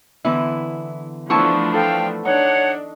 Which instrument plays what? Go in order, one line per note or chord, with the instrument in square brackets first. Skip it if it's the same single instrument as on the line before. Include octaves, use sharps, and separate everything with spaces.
[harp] D3 E3 B3 [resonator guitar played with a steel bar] E4
[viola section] F3 A3 D4 [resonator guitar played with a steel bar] B3 E4 A5 [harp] C#6
[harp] A4 [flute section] F5 G5
[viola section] D4 [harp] D#4 [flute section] C#5 F#5